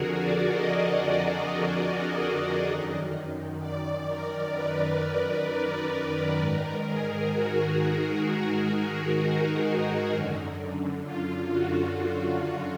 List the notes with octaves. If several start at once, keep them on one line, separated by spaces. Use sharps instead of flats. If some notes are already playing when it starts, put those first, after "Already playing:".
Already playing: F2 D3 F#4 G#4 A#4
D5
D#5
D#5
F#2 D#3
D5
A#4
B4
G#2 D#3 A#4
G#4
F#4
D#4
F#2 D3
F4
F#4
F4
F4